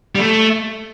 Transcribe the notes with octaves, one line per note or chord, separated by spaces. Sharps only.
G3
A3